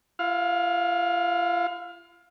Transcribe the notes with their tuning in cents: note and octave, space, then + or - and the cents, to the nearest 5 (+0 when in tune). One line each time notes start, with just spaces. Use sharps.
F4 -45 F5 +25